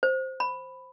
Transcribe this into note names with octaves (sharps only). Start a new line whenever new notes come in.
C5
B5